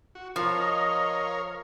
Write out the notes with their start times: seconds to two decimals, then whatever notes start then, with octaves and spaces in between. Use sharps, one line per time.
0.15 F#4
0.36 F3 A#4 C#5 F5
0.58 D#5